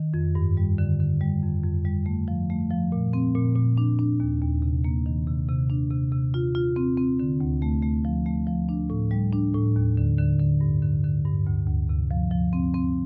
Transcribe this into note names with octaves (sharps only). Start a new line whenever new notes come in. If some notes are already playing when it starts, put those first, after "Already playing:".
Already playing: D#3
F2
G2
G3
D3
D3
G3
F2
F2
G3
A3
F3
A3
F3
A#2
C4
A#2
A#2
D4
D4
D#2
D#2
C3
A#3
D#3
C3
C3
D4
C3
C3
F4
F4
C4
C4
D3
D2
A3
A3
F3
A3
F3
D4
A2
G3
D4
A2
D#2
D3
D3
D3
G2
D3
D3
G2
D2
D2
C3
F3
F3
C4
C4